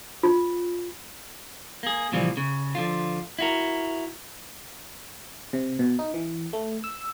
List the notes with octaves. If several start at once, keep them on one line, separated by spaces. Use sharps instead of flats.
F4
A#3 G#4
A#2 C#3 E3 F3 G3 A#3
C#3
D3 F3 F4
E4 F#4 A#4
C3
B2
D#4
E3
A3
E6